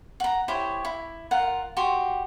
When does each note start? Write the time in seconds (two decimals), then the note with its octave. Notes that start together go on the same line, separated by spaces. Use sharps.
0.20 F#5 A#5
0.48 E4 G4 C5 C#5
0.85 E4
1.31 F4 A#4 F#5
1.77 F#4 G4 C6